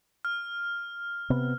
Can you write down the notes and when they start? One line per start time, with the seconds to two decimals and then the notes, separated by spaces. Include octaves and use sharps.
0.25 F6
1.30 C3 B3